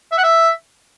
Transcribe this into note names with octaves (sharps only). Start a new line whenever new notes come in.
E5
F#5
E5